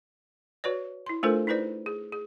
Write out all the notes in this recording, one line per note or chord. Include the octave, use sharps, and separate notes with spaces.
F#4 B4 C#5 D5
E4 C6
A3 D4 F4 A4 A#4 C5
D#4 E4 B4 C5 D5
G#4
G#4